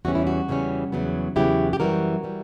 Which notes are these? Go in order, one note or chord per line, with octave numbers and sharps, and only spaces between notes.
E2 C#3 E3 G3 C#4 F#4
E4
F#4
E2 C#3 E3 G3 C#4
E2 C#3 F#3 B3
E2 C#3 F#3 B3 E4 G4
G4
F#2 E3 G3 F#4 A#4
E3 G3